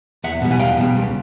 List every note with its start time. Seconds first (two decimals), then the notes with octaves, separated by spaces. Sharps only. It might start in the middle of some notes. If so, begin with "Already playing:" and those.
0.24 E2 E5 F#5
0.41 B2 G3
0.51 F#5 G#5
0.59 E2 F5 G5
0.77 B2 G3
0.96 C#2